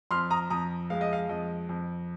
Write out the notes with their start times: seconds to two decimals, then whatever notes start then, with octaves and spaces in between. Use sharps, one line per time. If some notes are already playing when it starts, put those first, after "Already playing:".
0.11 F2 C6 F6
0.30 A#5 D#6
0.50 F2 A#5 D#6
0.90 G#3 F5
1.01 D#5
1.13 F5
1.29 F2 D#5
1.69 F2